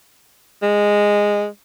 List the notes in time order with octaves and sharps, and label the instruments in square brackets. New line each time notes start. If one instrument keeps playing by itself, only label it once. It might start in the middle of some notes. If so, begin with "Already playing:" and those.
[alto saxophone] G#3